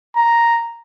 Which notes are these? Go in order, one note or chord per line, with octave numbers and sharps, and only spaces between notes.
A#5